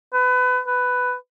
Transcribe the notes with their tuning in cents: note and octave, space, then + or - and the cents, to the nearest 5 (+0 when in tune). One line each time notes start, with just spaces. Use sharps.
B4 +25
B4 +10